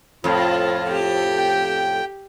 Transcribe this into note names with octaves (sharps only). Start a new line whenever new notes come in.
F2 A2 F4
G4
G5